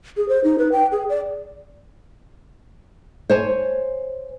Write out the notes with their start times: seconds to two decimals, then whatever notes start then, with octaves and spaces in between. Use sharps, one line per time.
0.17 G#4
0.29 C5
0.44 D#4
0.59 B4
0.72 G5
0.92 G#4
1.09 D5
3.30 C5 C#5 G#5